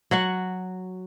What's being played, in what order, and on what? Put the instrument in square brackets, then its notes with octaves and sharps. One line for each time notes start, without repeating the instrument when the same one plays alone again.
[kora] F#3 F#4 F#5